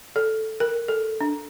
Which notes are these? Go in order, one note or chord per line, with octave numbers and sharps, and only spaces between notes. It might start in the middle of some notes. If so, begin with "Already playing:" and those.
A4
A#4
A4
D4